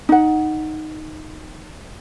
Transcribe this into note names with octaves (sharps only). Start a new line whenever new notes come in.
D#4 F#5